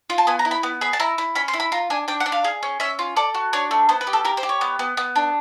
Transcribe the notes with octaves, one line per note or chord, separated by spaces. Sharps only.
F4
A5
B3 G#5
A#5
E4
B5
B3
G#4 B5
A5
E4 A#5
E4
C#4 B5
C6
E4
B5
F4 A#5
D4 G#5
D4 G5
F#5
D4
F5
G#4
C#4
C#4 E5
F4
A4 D5
F#4
D4 C#5
A3
B3 C5
B4
G4
A4
G4 A#4
C5
G4
C#5
B3
B3
B3
D4